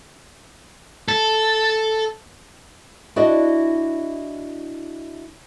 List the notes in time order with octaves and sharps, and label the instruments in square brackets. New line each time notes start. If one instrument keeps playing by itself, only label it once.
[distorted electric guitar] A4
[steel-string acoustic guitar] D4 E4 F#4 D5 D#5